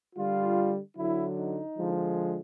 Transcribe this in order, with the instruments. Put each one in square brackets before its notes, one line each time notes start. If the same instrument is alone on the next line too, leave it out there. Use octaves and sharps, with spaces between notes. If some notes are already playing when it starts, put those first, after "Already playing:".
[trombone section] D3 G3 F4
D3 F#3 E4
D#4
D3 F3 G#3